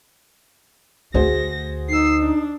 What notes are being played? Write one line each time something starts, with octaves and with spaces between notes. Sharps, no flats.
D2 A3 F#4 G#4 C5 A#6
D#4 E6 C7
D4